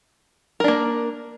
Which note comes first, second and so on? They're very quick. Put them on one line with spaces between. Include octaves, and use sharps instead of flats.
A#4 D4 A#3